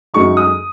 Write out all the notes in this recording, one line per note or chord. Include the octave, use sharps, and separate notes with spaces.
F#2 C#3 G#3 D#4 C#6
D#6